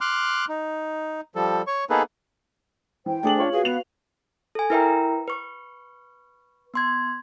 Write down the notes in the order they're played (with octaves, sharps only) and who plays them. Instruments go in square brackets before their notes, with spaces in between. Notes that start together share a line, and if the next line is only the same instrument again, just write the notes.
[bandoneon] C6 D6 F6 F#6
D#4
F3 G3 A4
C#5 C#6
A#3 B3 D#4 G#4 A4 B4
[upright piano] E3 [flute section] C5 G5
[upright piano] A3 G#4 F#7 [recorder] D4
[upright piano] F4 C#5
[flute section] F#4 B4 F5 [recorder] G#4
[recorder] B3 [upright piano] F7
[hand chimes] A4 G#5
E4 A#4 B4 E5 G5 A#5
B4 C#6
B3 C6 G#6